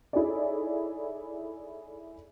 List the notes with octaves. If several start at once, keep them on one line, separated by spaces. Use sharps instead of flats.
D#4 E4 G#4 A4 C#5 D5